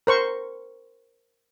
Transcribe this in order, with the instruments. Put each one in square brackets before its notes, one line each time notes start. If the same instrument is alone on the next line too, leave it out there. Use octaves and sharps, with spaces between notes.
[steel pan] A#4 C5 C#6